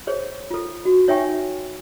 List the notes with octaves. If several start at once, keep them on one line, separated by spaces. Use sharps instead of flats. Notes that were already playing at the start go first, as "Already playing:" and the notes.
G#4 C5 C#5
F4 A4
F#4
D#4 C#5 E5 G5 G#5 C#6